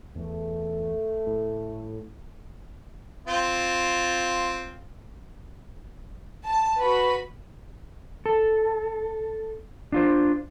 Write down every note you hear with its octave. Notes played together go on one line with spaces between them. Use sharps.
E2 A3
A2
C4 F4
A5
F#4 B4 B5
A4
D4 F4 C5